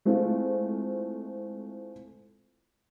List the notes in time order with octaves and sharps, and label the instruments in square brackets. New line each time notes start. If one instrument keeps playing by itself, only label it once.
[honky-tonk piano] G#3 A3 C4 E4 F4